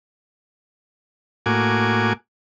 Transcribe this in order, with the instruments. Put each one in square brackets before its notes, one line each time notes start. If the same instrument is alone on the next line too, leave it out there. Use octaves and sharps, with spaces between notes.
[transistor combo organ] A2 A#3 F#4 G#5 D6